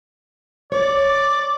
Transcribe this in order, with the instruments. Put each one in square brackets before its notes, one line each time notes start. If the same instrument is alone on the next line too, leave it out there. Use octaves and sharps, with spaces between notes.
[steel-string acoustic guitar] C#5 [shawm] D5